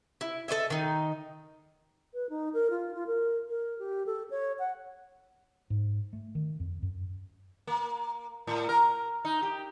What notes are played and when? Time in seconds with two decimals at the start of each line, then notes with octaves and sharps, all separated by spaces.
0.21 E4
0.48 A4 C#5 D#5 E5
0.70 D#3 D#4
2.14 B4
2.30 D#4
2.54 A#4
2.70 F4
2.95 F4
3.07 A#4
3.48 A#4
3.79 G4
4.06 A4
4.31 C#5
4.59 F#5
5.70 G#2
6.13 A3
6.35 D#3
6.60 F2
6.83 F#2
7.67 A#3
8.47 A2
8.69 A#4
9.25 D#4
9.42 G4